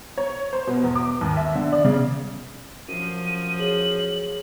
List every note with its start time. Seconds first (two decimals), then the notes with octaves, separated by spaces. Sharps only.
0.18 C#5
0.53 C5
0.67 B2
0.83 E2
0.95 D6
1.21 D#2
1.37 E5
1.55 D3
1.73 D5
1.85 C#3
2.88 F#2 F3 D#7
3.59 G#4 C#5 F#7